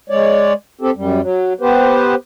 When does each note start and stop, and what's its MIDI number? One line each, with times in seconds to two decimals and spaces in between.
0.10 0.53 56
0.10 0.53 73
0.10 0.53 74
0.81 0.91 60
0.81 0.91 67
0.81 0.91 69
0.96 1.21 42
0.96 1.21 55
1.21 1.53 54
1.61 2.15 59
1.61 2.15 67
1.61 2.15 71
1.61 2.15 72